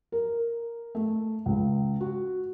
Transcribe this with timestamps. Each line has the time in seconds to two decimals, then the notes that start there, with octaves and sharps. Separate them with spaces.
0.12 A#4
0.95 A3
1.46 C#2
2.01 F#4